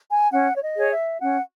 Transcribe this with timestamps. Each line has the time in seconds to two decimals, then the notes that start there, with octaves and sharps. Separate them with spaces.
0.10 G#5
0.32 C#4 F#5
0.56 C#5
0.62 D#5
0.76 G#4 C#5
0.92 E5
1.20 C#4 F#5